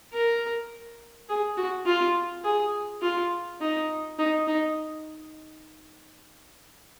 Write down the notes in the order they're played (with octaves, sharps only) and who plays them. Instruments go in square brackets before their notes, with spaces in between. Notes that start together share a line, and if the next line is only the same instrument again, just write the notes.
[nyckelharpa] A#4
G#4
F#4
F4
G#4
F4
D#4
D#4
D#4